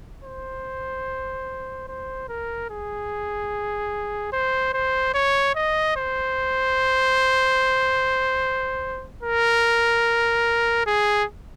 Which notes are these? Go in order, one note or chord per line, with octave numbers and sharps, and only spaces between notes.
C5
C5
A#4
G#4
C5
C5
C#5
D#5
C5
A#4
G#4